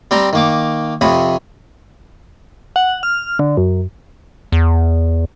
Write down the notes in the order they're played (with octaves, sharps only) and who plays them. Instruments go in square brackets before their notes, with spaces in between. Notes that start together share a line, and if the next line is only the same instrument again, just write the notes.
[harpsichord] G3 C4 G5 A#5
D#3 A#3 D6
F2 C3 C#5 B5 D#6
[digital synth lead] F#5
F6
D3
F#2
[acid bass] E2